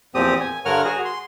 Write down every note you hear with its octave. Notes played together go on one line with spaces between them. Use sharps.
E2 A#2 F3 C4 G4 D#6
G#5
G2 D3 A#4 C#5 F#5 F6
F#4 G#4
C6